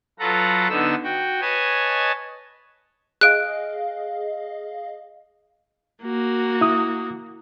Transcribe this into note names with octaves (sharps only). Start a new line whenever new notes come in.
F#3 F4 A4 B4 F#5 A#5
D3 B3 D#4 E6
F#4 G5
B4 C#5 D#5 G#5 A5
G#4 D#5 F5 F#6 D7
A#3 F#4
E4 D#6